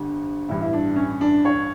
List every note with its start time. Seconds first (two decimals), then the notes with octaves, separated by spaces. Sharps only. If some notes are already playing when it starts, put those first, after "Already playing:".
Already playing: G1 F2 D3 G3
0.49 A1 G2 E3 E4
0.61 E4
0.73 D4
0.96 C#4
1.21 D4
1.45 C#5